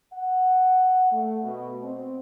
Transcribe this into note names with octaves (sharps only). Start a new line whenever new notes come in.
F#5
A3
B2
C4